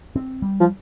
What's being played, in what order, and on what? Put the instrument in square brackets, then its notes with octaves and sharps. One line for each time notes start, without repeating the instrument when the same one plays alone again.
[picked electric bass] C4
G3
[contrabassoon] F3